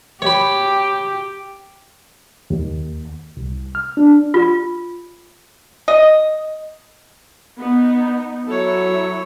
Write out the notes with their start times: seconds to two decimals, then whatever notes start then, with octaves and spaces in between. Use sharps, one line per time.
0.22 G4 C#5 B5
2.50 D#2
3.37 C2
3.75 F6
3.97 D4
4.34 F4
5.88 D#5
7.59 B3 D#4
8.47 F#3 E4 A4 C#5